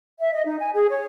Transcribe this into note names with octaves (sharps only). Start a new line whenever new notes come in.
E5
D#5
D#4
G#5
G#4
C#5